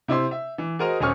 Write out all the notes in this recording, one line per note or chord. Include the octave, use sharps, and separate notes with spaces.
C3 E4 C5 C6
E5
E3
F#4 G#4 A#4 C5 D#5 A#5
D#1 C#4 C5 G#5 C#6 F6